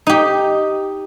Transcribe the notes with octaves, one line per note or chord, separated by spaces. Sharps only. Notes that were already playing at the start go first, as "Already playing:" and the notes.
D#4 G4